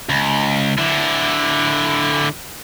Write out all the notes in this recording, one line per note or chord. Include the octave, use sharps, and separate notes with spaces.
C#2
D3 E4